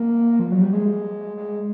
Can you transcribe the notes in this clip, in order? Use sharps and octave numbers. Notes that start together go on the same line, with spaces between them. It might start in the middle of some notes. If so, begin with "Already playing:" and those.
Already playing: A#3
F3
F#3
G3
G#3
G#3